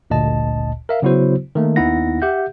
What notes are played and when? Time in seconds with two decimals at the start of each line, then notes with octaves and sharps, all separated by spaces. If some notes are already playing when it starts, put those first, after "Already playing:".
0.10 G1 D2 A#2 D#5 A5
0.89 A#4 E5 F5
1.02 C#3 F#3 B3 E4 F#4 C5
1.55 D#3 A3 A#3
1.76 D#2 B3 D#4 E4 F#5 A#6
2.22 G4 E5 F#5 G6